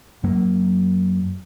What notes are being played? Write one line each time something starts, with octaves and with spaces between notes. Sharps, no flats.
F#2 F#3 A#3